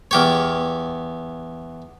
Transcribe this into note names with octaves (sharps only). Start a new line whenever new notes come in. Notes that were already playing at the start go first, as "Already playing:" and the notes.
E2 G4 C#5